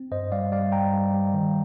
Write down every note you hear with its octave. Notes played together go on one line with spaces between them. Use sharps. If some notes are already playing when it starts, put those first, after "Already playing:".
Already playing: C4
G2 C5 D#5
G3 D5 F5
G3 D5 F5
G2 G5 A#5
G3
G3
D#3